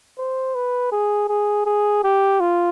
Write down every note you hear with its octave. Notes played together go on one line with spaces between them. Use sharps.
C5
B4
G#4
G#4
G#4
G4
F4